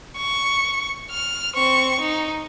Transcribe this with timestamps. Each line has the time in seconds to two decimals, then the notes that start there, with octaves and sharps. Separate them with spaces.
0.17 C#6
1.11 F6
1.55 C4 C#6
2.00 D#4